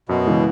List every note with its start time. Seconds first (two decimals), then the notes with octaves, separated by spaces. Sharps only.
0.09 F#2 B2
0.26 C#3 E3 G#3